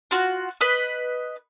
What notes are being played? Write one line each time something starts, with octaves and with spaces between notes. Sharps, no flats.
F4 F#4
B4 D#5